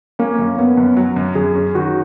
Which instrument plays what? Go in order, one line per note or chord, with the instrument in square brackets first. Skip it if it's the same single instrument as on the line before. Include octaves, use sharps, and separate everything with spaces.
[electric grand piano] A#3 [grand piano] C#4
[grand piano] F#2
[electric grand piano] B3 [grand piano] C#4
[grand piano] F#2
F#3
F#2
[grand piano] F#2 [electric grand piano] G#4
[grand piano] C#4
[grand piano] D#3 [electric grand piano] F#4